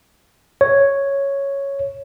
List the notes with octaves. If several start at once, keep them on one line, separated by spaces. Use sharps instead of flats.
C#5